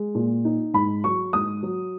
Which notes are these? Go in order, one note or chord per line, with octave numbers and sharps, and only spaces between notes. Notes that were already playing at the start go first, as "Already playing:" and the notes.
Already playing: G#3
A#2
D#4
G#2 B5
F#3 C#6
G#2 D#6
F#3